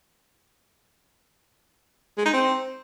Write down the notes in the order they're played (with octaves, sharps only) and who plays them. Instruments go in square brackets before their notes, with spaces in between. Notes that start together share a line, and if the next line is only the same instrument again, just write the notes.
[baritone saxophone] G#3
D#4
C4